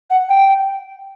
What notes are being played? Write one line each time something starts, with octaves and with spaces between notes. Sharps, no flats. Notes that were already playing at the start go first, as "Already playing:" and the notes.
F#5
G5